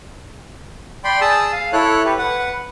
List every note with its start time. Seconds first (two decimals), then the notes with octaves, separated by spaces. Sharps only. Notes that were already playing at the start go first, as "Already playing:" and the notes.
1.04 D5 G5 B5 C6
1.21 G#4 A5 D#6 E6
1.53 F5
1.73 E4 A4 C#5 F#6
2.05 G4 B4
2.18 B4 F#5